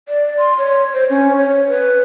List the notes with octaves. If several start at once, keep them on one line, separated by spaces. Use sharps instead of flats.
D5
C6
C#5
C5
C#4
C#5
B4